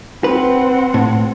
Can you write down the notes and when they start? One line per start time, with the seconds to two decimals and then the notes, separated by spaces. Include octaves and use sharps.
0.24 C4 B4 F#5
0.94 A2